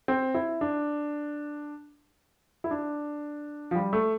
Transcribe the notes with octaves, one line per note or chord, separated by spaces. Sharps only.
C4
E4
D4
E4
D4
F3
G3
A3